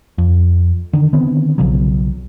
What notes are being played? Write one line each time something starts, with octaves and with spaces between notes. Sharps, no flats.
F2
D3 D#3
D3 D#3 B3 C4
B1 C#3 F3 F#3